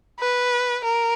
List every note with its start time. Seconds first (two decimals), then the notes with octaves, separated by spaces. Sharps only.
0.20 B4
0.85 A#4